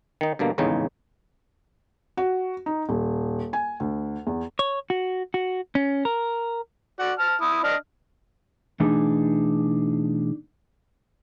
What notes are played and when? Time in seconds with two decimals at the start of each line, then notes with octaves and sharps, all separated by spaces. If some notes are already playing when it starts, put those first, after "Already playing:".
0.21 D#3 D#4
0.39 G2 B2 D3 A#3
0.58 G#1 E2 A2 C#3 D#4
2.17 F#4
2.66 D#4
2.89 D#1
3.53 G#5
3.80 D2
4.27 E2
4.59 C#5
4.90 F#4
5.34 F#4
5.75 C#4
6.05 A#4
6.99 F#4 D5 F#5
7.19 A5 F6
7.41 E4 D#6
7.64 D4 D#5 F6
8.80 B2 E3 A3 D4 D#4 G#4